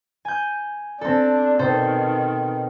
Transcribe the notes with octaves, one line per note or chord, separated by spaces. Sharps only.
G#5 G6
C4 D4 A4
B2 D#3 A4 C5